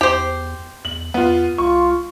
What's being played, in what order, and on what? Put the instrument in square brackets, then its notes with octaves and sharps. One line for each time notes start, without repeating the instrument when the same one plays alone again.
[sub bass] E2 [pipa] G4 C5
[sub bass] E2 [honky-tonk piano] F#7
[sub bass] E2 [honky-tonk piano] B3 F4
[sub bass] C2 [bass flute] F4 [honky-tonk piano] C#6